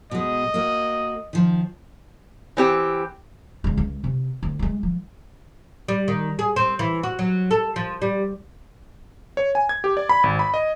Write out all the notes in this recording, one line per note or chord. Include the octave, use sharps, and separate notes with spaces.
B2 G#3 D#5
A#3 F#4
D#3 F3
E3 C4 G4
C#3 G#3
C#2
C3
D2
F#3 G#3
F3
G3
D#3
G#4
C4
E3
F#4
F#3
A4
F3
G3
C#5
G#5
G#6
G4
D5
B5
G#1
B5
D#5